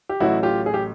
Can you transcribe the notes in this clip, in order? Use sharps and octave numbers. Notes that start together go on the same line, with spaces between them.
G4
A1 A2 F#3 E4 F#4
F4 G4
G#4
G4